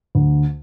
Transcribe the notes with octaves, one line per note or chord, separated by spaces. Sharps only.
D2